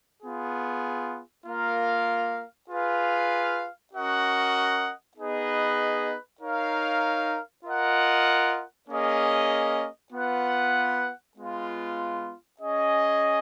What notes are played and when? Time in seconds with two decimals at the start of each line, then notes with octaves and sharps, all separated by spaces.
0.22 B3 F4 G#4
1.46 A#3 F4 A#4 F5
2.70 F4 G#4 B4 F5
3.94 C#4 F#4 A#4 D#5 F#5
5.17 B3 D#4 G#4 B4 D#5
6.41 D#4 A#4 C#5 F5
7.65 F4 A#4 D#5 F#5
8.89 A#3 C#4 G#4 D#5
10.12 B3 F4 B4 F#5
11.36 G#3 B3 F4
12.60 C#4 G#4 D#5